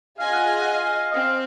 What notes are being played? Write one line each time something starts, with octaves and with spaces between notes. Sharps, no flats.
F4 G#4 D#5 F5 G#5
F#5
F5
F#5
F5
D#5
C4 F5